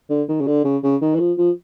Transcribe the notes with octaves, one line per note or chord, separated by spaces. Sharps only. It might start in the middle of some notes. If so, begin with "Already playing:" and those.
D3
D#3
C#3
D3
C#3
C#3
D#3
E3
F3
F3